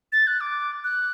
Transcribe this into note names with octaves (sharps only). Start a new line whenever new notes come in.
A6
F#6
D6
F#6